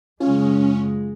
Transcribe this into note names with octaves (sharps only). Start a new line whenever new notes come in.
F#2 C#3 G#3 C#4 F4